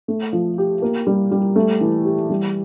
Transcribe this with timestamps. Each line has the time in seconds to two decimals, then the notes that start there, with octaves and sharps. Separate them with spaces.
0.08 A3
0.33 F3
0.58 G4
0.82 A#3
1.07 G3
1.32 G3
1.56 A3
1.81 E3
2.05 G4
2.29 G3